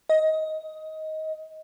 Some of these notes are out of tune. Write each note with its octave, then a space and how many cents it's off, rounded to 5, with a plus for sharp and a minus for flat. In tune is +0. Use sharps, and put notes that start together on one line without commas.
D#5 +15